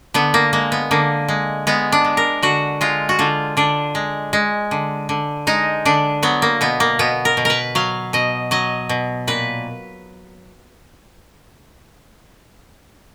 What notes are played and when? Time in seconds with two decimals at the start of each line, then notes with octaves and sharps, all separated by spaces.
0.14 D3 B3
0.34 A#3
0.53 G#3 A#3
0.72 B3
0.91 D3 A#3
1.28 G#3
1.67 G#3 B3
1.92 D4
2.05 G#3
2.17 A#4
2.43 D3 F#4
2.81 G#3 F4
3.09 F#4
3.19 D3 F4
3.57 D3 D4
3.95 G#3
4.33 G#3
4.71 D3
5.09 D3
5.47 G#3 D#4
5.85 D3 D4
6.23 F#3 B3
6.42 A#3
6.61 B2 B3
6.80 A#3
6.99 B2 B3
7.25 A#4
7.37 B2
7.45 A#4 B4
7.75 F#3 F5
8.13 B2 D#5
8.51 F#3 D#5
8.89 B2
9.27 A#2 B4